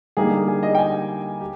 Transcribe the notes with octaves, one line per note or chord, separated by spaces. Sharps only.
D3 G3 A#3 D#4 G4 G#4
G#4
D#5
G5
G#5
G4